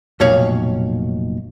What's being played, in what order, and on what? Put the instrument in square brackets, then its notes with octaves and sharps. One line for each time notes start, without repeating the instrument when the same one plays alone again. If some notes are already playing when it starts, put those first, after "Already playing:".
[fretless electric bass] F1 A#2 A#3 [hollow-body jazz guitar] B1 C#5 F5